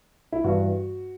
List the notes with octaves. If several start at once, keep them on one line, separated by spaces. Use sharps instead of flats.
E4
G2 E3 G3 F#4